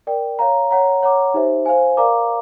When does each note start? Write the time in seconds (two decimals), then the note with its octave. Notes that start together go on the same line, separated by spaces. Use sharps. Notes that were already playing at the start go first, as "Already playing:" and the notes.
0.07 A#4 D5 G5
0.39 C#5 F5 A#5
0.71 C#5 F#5 A#5
1.03 C#5 F#5 A#5 D6
1.34 D#4 G4 C5 E5
1.66 C5 F5 G#5
1.97 A#4 D5 F5 A#5 D6